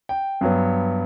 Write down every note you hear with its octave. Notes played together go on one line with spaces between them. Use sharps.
G5
G2 F#3 B3